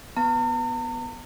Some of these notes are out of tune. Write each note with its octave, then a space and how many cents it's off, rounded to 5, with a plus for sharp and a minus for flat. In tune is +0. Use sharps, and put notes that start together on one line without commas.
B3 +0 A#5 -45